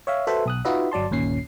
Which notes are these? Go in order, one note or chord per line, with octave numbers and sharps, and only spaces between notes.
C#5 E5 F5
F#4 A4 B4 C5 E5 B5
B1 D#6 F#6
D#4 F4 F#4 B4 D#5 E5
G1 F#3 D5 A5 C6
G1 D#2 A#2 C#4 C7